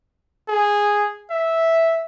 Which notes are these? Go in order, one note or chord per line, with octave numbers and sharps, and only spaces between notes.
G#4
E5